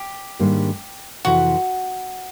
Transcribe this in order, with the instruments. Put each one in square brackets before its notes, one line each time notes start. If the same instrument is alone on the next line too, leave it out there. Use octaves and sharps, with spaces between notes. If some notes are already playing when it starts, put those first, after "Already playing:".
Already playing: [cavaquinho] G4
[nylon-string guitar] G#2 D#3 G3 A#3 D4
[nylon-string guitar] F2 C3 E3 [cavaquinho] F#4